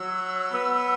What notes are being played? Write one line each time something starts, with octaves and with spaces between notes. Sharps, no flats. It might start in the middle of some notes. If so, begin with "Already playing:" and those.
Already playing: F#3 E6
B3